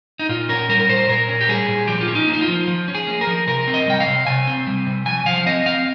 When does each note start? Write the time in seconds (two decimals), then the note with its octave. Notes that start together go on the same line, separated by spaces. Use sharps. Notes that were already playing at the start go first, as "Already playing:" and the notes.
0.19 D#4
0.29 A#2 F4
0.49 C#4 A#4
0.69 G3 A#4
0.80 A#4
0.89 A#2 C5
1.09 A#2 A#4
1.29 C#4
1.41 G4
1.49 G3 G#4
1.68 A#2
1.88 F3 G4
2.01 F4
2.08 C#4
2.15 D#4
2.28 A#3
2.34 D#4
2.41 F4
2.48 F3
2.68 F3
2.88 C#4
2.95 G#4
3.07 A#3
3.21 A#4
3.27 F3
3.47 C3 A#4
3.68 C4
3.74 D#5
3.87 G3 G5
4.00 F5
4.07 C3
4.27 C3 G#5
4.47 C4
4.67 G3
4.86 C3
5.06 F3 G#5
5.26 F3 F5
5.46 C4 D#5
5.66 C4 F5